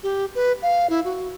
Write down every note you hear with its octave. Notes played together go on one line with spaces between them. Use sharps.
G4
B4
F5
E4
F#4